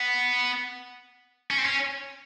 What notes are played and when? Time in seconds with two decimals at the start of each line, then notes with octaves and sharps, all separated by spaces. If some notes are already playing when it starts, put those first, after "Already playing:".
Already playing: B3
1.51 C#4
1.58 C4
1.66 C#4